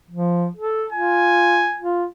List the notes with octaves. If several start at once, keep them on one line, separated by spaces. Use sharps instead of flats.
F3
A4
F4 G#5
F4